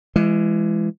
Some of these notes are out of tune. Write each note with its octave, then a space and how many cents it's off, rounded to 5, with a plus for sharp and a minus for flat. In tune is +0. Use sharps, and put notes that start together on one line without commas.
E3 +30 G#3 +0